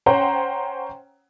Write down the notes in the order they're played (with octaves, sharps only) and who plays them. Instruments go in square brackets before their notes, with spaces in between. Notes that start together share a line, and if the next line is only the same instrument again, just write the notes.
[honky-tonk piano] C#4 C5 F#5 G5 A#5